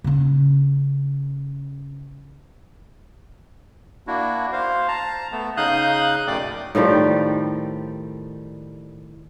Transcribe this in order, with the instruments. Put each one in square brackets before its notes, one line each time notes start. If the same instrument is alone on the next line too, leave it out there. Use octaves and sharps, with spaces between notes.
[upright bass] C#3 C#4
[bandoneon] A#3 D4 E4 F#4
C5 F5
A5 A#5
A3 B3
C#3 D#4 F5 D#6 F#6 G6
F#2 B2 A3 D5 G5 D6
[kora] A2 D#3 F3 G3